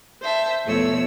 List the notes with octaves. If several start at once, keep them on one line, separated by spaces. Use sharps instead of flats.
C5 E5 A5
E2 B2 F3 A3 C#5 E6